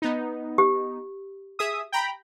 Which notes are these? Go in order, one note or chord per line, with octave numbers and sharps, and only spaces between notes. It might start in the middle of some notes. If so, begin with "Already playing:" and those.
B3 D#4
G4
G#4 E5 D#6
G5 A#5 B5